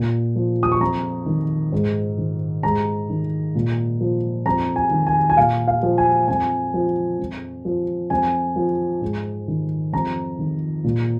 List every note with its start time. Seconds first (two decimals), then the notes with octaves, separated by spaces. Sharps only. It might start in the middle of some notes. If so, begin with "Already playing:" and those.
Already playing: A#2
0.36 F3
0.63 D#6
0.72 C#6
0.81 F2 A#5
1.26 D#3
1.72 G#2
2.18 D#3
2.63 G#2 A#5
3.10 D#3
3.55 A#2
4.01 F3
4.46 F2 A#5
4.76 G#5
4.91 D#3
5.07 G#5
5.30 G#5
5.37 A#2 F5
5.68 F5
5.83 F3
5.98 G#5
6.28 F2 G#5
6.74 F3
7.19 F2
7.65 F3
8.10 F2 G#5
8.56 F3
9.01 G#2
9.48 D#3
9.93 F2 A#5
10.39 D#3
10.84 A#2